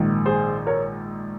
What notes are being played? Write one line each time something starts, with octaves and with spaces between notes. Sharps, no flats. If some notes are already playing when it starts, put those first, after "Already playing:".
Already playing: A#1 G#2 D#3
G#4 C5
A#4 C#5